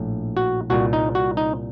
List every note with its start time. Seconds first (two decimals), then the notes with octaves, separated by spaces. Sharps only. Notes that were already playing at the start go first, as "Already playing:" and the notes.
Already playing: A#1 A2
0.37 F#4
0.70 C2 A#2 F#4
0.93 D#4
1.15 F#4
1.37 D#4